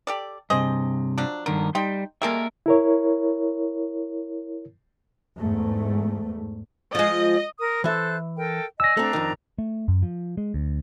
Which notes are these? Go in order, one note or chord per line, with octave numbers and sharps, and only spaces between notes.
G4 A4 D5
G2 C3 G#4 C5 D#5
F3 F#3 D4
G2 D3 D#3 A#4
G3 D#4 G5 C6
G3 G#3 A#3 A4 A#4 E5
E4 A#4 C#5
E2 G#2 A3
F3 G#3 D#5
A#4 D#6
E3 A4 C5 E5 F#6
A4 A#4 G5
D5 D#5 G#5 E6 A#6
A3 C4 D4 A#5
F2 D#3
A3
F#2
F3
G#3
D2